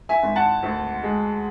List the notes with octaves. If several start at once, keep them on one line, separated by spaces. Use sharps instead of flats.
E5 G#5
G#1
F#5 A5
D2
G#3